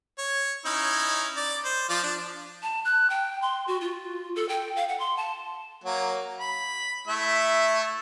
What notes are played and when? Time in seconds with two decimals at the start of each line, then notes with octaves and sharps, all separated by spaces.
0.18 C#5
0.66 C#4 D#4 E4
1.37 D5
1.65 C5
1.89 F3 F4 D5
2.03 D4
2.62 A5
2.85 F#6
3.10 G5
3.42 C6
3.68 F#4
3.81 F4
4.36 A4
4.49 G5
4.76 F5
4.89 F#5
5.00 C6
5.17 A5
5.84 F#3 A#3
6.39 B5
7.07 A3 E4 E5